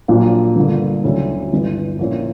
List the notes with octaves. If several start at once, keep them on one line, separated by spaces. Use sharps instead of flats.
A#1 A#2 F#3 A#3 D4
G1 G2 D3 A#3
D2 D3 F#3 C#4 E4
G1 G2 E3
A#1 A#2 A#3 C#4 E4